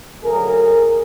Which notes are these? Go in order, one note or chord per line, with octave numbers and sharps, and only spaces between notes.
D2 C#3 F#3 G#4 A#4